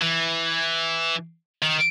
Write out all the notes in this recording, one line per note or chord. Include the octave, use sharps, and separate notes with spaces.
E3
D#3